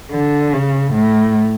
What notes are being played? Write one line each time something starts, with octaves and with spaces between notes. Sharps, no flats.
D3
C#3
A2